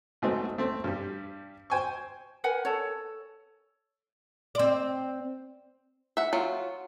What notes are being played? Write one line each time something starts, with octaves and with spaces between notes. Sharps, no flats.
G#2 F#3 A3 B3 C4 D#4
A3 C4
G2 G3
C5 G5 G#5 C6 C#6
A#4 B4 F#5 G#5
A4 C#5
C4 D5
E5 F#5
F#3 F4